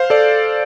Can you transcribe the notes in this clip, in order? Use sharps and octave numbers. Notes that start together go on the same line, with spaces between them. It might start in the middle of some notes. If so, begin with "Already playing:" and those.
Already playing: C5 F5
A4 D5